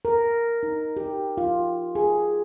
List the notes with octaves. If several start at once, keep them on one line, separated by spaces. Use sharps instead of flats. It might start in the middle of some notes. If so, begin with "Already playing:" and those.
A#4
D#4
G4
F4
G#4